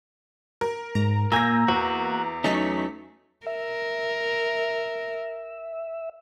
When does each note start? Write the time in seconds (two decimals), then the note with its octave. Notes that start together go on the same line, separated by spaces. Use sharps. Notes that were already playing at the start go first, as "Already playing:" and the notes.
0.61 A#4
0.95 G#2 A#5
1.32 A#2 A#3 G#5 A#5 E6 G6 A#6
1.68 E2 F#4
2.44 F#3 A3 C#4 D#4 C#6 B6
3.46 A#4 E5